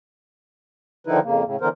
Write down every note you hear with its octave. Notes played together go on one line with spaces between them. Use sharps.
D3 D#3 F3 D#4 E4 B4
F2 C#3 A#3
A2 C#3
D3 E3 B3 A#4 C5